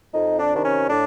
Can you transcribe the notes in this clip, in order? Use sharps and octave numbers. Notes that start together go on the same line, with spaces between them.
F2 D#4
D4
C3 D#3 D4
C#4
A2 D4